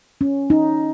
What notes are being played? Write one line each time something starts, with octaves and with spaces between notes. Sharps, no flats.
C#4
D#4